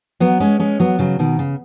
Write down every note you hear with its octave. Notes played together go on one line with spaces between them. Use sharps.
F#3 B3
G#3 C#4
G#3 C#4
F#3 B3
C#3 F#3
B2 D#3
C#3